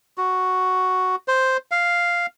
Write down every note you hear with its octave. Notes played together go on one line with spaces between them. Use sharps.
F#4
C5
F5